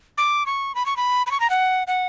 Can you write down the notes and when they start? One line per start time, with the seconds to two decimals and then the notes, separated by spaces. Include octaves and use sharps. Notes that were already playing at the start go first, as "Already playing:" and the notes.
0.17 D6
0.46 C#6
0.75 B5
0.86 C#6
0.96 B5
1.26 B5
1.31 C#6
1.40 A#5
1.50 F#5
1.87 F#5